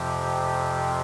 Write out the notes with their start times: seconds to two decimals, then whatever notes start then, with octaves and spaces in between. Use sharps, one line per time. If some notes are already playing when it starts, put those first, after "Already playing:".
Already playing: F2 C3 F3 G4
0.43 G4